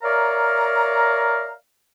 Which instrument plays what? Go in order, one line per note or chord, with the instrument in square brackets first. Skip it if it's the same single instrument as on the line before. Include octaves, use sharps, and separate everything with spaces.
[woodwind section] A#4 C#5 D5 E5 F5 A#5